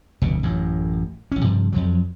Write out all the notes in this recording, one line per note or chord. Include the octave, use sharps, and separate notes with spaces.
F1 D2 B2
A1 F#2 A2
A1 C#4
G2 C3 F3
F2 F3 F#3